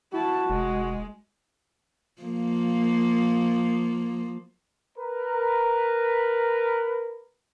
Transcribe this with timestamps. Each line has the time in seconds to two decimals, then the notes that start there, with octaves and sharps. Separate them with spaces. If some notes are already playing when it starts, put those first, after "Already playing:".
0.13 E4 F#4 A5
0.50 F1 G#3
2.22 F3 A#3
4.98 A#4 B4